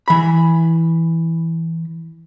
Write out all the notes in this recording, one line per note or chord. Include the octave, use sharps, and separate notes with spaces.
E3 B5